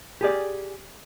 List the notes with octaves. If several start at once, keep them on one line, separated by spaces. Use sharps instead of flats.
G4 G#4 D5